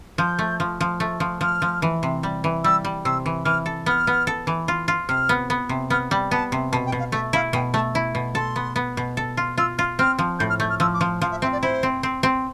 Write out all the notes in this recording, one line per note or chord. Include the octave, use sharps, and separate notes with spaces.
F3 G6
A3
F3
F3
A3
F3
F3 F6
F3
E3
C3
G3
E3
G3 E6
G3
C3 E6
E3
E3 F6
A4
B3 F6
B3
A4
E3
F4
F4
C3 F6
B3
B3
C3
B3 F6
G3 B5
B3 A5
C3
B2 A5
G5
B2
F5
A3 E5
E4 F5
B2 G5
A3 A5
E4
B2
A4 C6
B3
B3
B2
A4
F4
F4 E6
F4 F6
C4 F6
F3
A2 G6
F6
A3 G6
F6
F3 E6
D6
F3 C6
F3 F5
E5
C4 E5
D5
E4 C5
C4
C4
C4